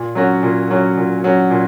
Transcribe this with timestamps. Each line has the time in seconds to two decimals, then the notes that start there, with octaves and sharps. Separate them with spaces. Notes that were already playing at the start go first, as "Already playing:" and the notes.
Already playing: A#2
0.15 F#3 C#4 F#4
0.43 A#2
0.70 F#3 C#4 F#4
0.97 A#2
1.24 F#3 C#4 F#4
1.50 A#2